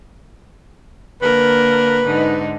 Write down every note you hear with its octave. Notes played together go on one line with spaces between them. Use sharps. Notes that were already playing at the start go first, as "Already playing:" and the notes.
D3 A#3 A#4 B4
G#2 D3 D#4